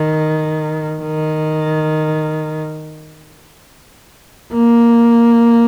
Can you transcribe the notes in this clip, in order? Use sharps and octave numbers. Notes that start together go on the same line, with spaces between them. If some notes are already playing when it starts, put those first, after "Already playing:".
Already playing: D#3
D#3
A#3